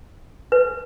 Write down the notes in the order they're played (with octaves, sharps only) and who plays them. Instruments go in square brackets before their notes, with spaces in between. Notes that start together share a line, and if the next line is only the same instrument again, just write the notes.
[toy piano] B4